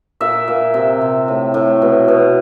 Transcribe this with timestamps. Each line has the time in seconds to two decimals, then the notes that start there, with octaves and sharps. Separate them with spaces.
0.20 A#2 E5
0.48 A#2
0.74 C3
1.01 C3
1.28 A2
1.54 A2
1.82 B2
2.08 B2